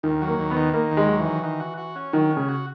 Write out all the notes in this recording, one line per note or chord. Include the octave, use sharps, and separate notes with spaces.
D#2 D#3
F#3
A#3
D#2
B3
D#3
D#3 A#3
D#2
G#3
F#3
E3
D#3
D#3
F#4
F#4
C#4
D#3 F#3
C#4
C#3
F#4